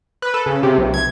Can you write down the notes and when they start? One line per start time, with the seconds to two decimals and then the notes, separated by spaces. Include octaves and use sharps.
0.22 B4
0.34 A4
0.46 C#3
0.63 C3
0.77 B1
0.94 G#6